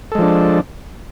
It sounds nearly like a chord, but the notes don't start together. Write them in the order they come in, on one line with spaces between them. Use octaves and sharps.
A4 G#3 F3 D4